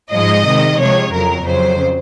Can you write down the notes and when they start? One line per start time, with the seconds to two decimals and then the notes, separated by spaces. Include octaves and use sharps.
0.11 G#2 F3 G#3 D#5
0.45 C3 D#3 G#3
0.79 C3 F3 G#3 C#5
1.12 F2 C#3 F#3 A#4
1.45 F2 C#3 F#3 C5